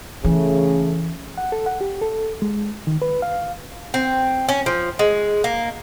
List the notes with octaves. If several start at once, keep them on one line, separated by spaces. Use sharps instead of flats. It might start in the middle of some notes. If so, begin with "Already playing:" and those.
C#3 E3 A3
F#5
A4
F#5
G4
A4
G#3
D#3
B4
F5
C4
C#4
F3
G#3
A#3